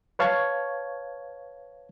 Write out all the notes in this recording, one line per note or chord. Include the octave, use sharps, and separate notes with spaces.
B4 C#5 F5 A5 C#6 G#6